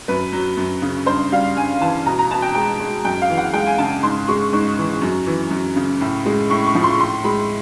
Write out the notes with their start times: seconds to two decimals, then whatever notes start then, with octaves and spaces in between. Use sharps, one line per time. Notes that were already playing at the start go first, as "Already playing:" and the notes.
0.08 F#2 B4
0.33 F#3
0.57 F#2
0.82 C#3
1.06 G2 C5
1.32 G3 F5
1.57 G2 G#5
1.81 E3 A5
2.06 B2 A#5
2.19 A#5
2.31 B2 A5
2.42 G5
2.55 G#3 G5
2.80 G#3
3.05 F#2 G5
3.22 F5
3.30 E3
3.37 F#5
3.53 G#3 G5
3.66 G#5
3.78 C#3 A5
4.03 G#2 C6
4.28 G#3 C#6
4.53 G#2 C#6
4.78 E3
5.02 F#2
5.26 E3
5.51 F#2
5.76 C#3
6.01 A2
6.26 G#3
6.50 A2 C#6
6.67 C#6
6.75 F3
6.83 C6
6.99 A2 C6
7.24 G#3 B5